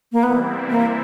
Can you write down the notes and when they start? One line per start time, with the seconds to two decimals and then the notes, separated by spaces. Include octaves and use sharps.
0.12 A#3
0.23 C3 E3 G3 B3 C4 E4
0.70 A#3